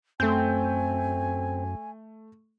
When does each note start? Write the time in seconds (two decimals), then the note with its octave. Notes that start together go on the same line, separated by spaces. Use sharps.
0.20 F#2 A3 C4 G#5 G6